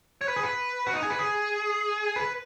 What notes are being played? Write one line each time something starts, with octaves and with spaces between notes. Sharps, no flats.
C#5
B4
G#4
B4
F#4
D#4
G#4
B4
G#4
B4